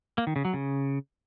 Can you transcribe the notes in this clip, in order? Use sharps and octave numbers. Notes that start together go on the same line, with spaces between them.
A#3
D#3
C#3
F#3
C#3